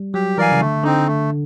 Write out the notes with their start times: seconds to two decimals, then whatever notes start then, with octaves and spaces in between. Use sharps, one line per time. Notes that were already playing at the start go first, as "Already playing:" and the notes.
Already playing: G3
0.14 F#3 G4
0.37 E3 A#4 D5 F5 G#5
0.52 C#3
0.61 D3 A3
0.84 D3 C4 D#4
1.07 A3